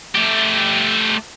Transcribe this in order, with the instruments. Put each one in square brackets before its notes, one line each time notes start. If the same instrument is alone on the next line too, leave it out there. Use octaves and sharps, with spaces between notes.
[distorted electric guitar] A3 G4